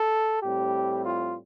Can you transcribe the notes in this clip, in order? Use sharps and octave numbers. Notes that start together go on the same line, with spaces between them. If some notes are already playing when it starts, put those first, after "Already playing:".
Already playing: A4
A2 G3 C4 G4
F4